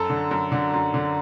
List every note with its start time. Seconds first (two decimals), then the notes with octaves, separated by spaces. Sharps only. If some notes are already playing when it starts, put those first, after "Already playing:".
Already playing: F#2 A4
0.10 D3
0.31 F#2
0.52 D3
0.73 F#2
0.94 D3